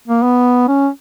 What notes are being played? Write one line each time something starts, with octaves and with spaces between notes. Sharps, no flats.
A#3
B3
C#4